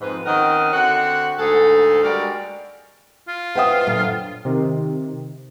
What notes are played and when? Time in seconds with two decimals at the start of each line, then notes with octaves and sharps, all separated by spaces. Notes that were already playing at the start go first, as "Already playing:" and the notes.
0.01 F2 G#2 B4
0.25 D#3 C4 C#4 A#4 D#5 F#5
0.73 D3 C4 F#4 F#5
1.39 D2 G#2 G#4 A4
2.03 G3 G#3 F#4 A#4 D5
3.28 F4
3.55 B4 C5 E5 F#5 G5 D#6
3.87 F#2 A#2 D3
4.45 C3 D#3